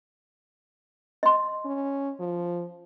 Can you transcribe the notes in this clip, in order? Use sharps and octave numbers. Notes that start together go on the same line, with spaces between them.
D#5 C6
C#4
F3